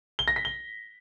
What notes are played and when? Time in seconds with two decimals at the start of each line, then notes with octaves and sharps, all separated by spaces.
0.19 G7
0.28 A#6
0.36 B6
0.45 G7